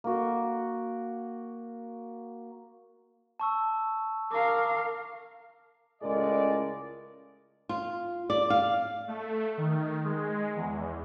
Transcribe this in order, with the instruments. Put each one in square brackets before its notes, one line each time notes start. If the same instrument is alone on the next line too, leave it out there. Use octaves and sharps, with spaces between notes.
[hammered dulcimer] A#3 F#4
[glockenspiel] A5 C#6 E6
[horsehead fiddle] A#4 F5 [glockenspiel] D6
[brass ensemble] C#2 A2 G#3 A#4 D5
[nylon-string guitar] F4
D5
F5
[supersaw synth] A3
D#3
G#3
E2